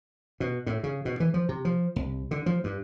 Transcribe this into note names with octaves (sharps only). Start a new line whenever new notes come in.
B2
A2
C#3
B2
E3
F3
C3
F3
C2
D3
F3
G2